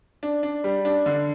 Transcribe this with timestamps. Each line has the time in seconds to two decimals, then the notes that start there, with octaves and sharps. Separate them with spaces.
0.23 D4
0.43 D4
0.64 G3
0.85 D4
1.06 D3